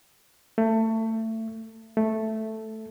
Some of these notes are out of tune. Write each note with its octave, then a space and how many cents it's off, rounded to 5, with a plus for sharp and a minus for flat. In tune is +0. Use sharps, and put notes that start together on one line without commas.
A3 +25
A3 +0